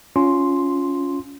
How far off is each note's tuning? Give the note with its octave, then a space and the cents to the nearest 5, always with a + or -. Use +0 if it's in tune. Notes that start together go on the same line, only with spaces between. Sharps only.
C#4 +15 F4 +10 C6 +0